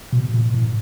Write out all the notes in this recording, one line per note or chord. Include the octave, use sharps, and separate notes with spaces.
B2
A#2
A2